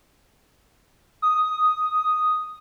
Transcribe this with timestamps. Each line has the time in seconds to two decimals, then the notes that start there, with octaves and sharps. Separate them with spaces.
1.22 D#6